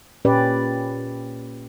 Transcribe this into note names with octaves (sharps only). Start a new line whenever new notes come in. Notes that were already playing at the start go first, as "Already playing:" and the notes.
A#2 C#4 G4 B4 D5